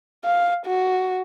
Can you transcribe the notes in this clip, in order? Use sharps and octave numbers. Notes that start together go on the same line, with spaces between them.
F5
F#4